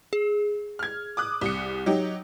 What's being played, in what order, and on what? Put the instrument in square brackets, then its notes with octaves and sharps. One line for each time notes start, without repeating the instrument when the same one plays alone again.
[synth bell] G#4
[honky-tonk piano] F6 G#6
D6 D#6 F#6
C2 C#7
F#3 D#4 G4